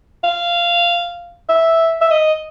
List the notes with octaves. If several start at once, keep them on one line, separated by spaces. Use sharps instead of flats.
F5
E5
E5
D#5